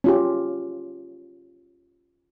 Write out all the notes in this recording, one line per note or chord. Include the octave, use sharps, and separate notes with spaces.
C#4 F4 G4